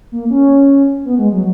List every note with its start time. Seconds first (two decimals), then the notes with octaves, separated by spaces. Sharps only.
0.12 A#3
0.30 C#4
1.05 B3
1.19 G#3
1.32 F#3